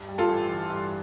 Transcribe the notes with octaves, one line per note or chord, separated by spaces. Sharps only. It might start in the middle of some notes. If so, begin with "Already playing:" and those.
Already playing: G2
G3
F4 A4
A1
E3
G2